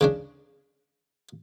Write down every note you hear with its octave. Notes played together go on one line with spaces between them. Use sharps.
C#3 C#4 D4